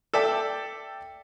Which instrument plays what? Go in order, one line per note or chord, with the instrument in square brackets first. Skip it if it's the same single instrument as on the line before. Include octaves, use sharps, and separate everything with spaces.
[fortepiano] A4 D5 E5 G5 A5